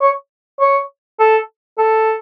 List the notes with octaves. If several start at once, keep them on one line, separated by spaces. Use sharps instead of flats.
C#5
C#5
A4
A4